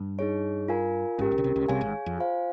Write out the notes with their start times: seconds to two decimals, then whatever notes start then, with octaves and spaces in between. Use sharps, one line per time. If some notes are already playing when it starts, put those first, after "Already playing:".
Already playing: G2
0.19 D#4 G#4 C#5
0.68 F4 A#4 F5 G#5
1.18 G#1 G#2 C#4 G4 A#4
1.31 A#1 A#2
1.38 C#3
1.44 C2 C3
1.56 C#2 C#3
1.68 C2 C3 G#4 C#5 F5 G#5
1.81 G#1 G#2
2.06 F2
2.18 F4 C5 F5 G#5